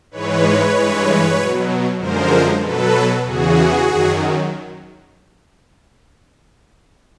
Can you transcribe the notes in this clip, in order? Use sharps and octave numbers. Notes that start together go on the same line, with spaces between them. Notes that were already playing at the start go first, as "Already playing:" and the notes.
G#2 E3 G#3 B4 C#5
G2 E3 G#3
B2 F#3
F#2 D3 F3 G#3 A#4 C5
B2 F#3 A4 B4
E2 C#3 E3 F#4 G#4
F#2 D#3 F#3